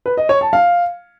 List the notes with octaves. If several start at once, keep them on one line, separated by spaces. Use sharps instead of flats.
B4
D#5
C#5
A5
F5